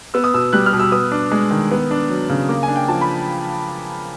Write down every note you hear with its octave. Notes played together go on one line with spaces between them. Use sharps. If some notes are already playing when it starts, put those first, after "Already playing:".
B3 E6
D#6
B2 E6
G3 F#6
F6
B2
E6
B3 D#6
D4
G#3
D#3
B3
D4
F#3
C#3
A#3 D6
G#5
D4
G5
F3 A5
B5